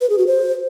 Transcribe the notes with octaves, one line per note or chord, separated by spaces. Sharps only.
B4
G#4
F#4
C5